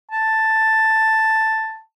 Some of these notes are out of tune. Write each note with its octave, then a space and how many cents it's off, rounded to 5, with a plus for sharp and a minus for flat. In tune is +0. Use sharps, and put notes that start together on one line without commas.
A5 +5